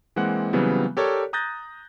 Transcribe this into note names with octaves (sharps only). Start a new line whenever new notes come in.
E3 G#3 A#3 C4 F#5 F#6
C#3 E3 F#3 G3 B3 C4
G4 A4 A#4 C#5 D5
A#5 D#6 F#6 G6 A6 A#6